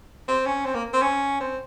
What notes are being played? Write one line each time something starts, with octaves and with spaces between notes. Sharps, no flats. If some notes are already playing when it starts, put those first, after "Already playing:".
C4
C#4
C4
A#3
C4
C#4
C4